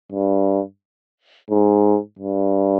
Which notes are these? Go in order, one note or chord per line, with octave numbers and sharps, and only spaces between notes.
G2
G#2
G2